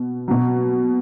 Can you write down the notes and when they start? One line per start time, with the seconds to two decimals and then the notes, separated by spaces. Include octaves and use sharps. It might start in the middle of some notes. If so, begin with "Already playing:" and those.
Already playing: B2
0.28 B2 F#3